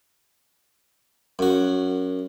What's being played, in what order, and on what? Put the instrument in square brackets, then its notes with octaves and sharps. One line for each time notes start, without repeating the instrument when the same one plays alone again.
[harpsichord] F#2 F#4